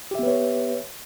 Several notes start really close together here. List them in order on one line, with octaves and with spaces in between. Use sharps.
G4 E5 B3 B4 C#5